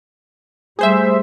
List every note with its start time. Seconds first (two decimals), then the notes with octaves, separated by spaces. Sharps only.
0.79 G3 A3 G#4 C5 E5